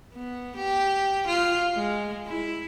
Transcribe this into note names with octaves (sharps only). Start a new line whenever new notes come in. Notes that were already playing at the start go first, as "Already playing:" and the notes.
B3
G4
F4
G#3
E4